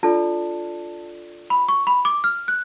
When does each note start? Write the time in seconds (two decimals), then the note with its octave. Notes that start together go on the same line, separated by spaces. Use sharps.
0.03 D4 F4 A4 D5 A5
1.50 B5
1.68 C#6
1.87 B5
2.05 D6
2.24 F6
2.48 F#6